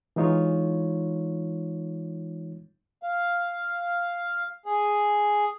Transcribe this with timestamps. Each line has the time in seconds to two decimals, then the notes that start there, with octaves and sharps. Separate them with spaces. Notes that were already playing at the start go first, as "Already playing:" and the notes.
0.16 E3 G#3 D#4 F4 C#5
3.03 F5
4.66 G#4